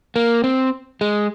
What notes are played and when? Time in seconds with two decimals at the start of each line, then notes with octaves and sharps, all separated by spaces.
0.16 A#3
0.44 C4
1.01 G#3